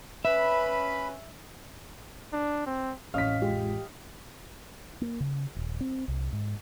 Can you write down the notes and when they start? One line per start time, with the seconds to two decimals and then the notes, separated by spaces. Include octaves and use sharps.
0.25 C#4 B4 E5 B5
2.33 D4
2.66 C4
3.14 A1 F2 C#4 D#5 F5 B6
3.42 G#3 F4 G4
5.01 A#3
5.20 C#3
5.56 D#1
5.81 C4
6.08 C2
6.33 G#2